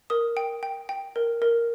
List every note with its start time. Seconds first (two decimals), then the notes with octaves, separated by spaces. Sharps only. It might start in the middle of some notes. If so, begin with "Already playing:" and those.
0.10 A#4 D#6
0.37 G5
0.63 G5
0.89 G5
1.16 A#4
1.42 A#4